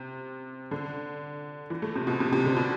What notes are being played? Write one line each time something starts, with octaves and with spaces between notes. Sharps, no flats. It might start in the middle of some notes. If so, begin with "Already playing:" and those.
Already playing: C3
D3
E3
A3
C3
B2
C3
C3
D3
B2